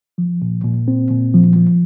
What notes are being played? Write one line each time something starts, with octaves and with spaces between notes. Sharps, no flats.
F3
A#2
A#2
C4
A#2
F3
F3